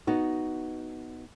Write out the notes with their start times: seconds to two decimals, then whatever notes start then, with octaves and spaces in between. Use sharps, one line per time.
0.07 B3 D#4 F#4